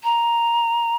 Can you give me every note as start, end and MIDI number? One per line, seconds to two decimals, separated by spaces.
0.04 0.96 82